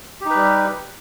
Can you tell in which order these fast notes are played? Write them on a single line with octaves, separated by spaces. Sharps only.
G4 D#4 B4 G3